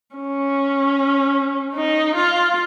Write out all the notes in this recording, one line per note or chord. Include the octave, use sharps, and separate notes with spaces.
C#4
D#4
F4